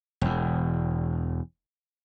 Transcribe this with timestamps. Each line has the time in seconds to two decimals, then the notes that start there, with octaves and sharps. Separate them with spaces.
0.21 E1 E2